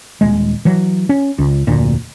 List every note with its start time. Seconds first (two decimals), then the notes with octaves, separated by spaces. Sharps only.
0.21 D#1 G#3
0.65 E3 F#3
1.09 C#4
1.39 C#2
1.67 F1 D2 A#2